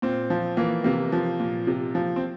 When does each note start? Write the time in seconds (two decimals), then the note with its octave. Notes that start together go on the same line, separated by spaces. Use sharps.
0.02 A#2 C4
0.30 F3
0.57 E3 A#3
0.84 C3 A#3
1.12 F3
1.40 A#2
1.67 C3
1.95 F3
2.16 C4